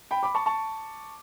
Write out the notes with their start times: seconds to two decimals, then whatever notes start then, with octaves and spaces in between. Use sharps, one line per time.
0.11 G5 B5
0.23 B5 D6
0.35 A5 C#6
0.46 A5 C#6